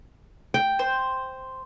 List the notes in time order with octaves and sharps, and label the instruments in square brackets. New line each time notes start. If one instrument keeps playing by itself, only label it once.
[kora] G5
[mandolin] C5